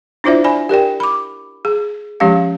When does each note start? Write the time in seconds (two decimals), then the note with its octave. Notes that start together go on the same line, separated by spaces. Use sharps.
0.24 D4 E4 F4 C5 D5 E5
0.44 D5 G#5 B5
0.69 G4 A#4 D5 G5
1.00 B5 D6
1.65 G#4
2.20 F3 G#3 C#4 G4 F5